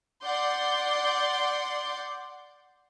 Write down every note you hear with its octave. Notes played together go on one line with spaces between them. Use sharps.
D5 F#5 C6 D6 G6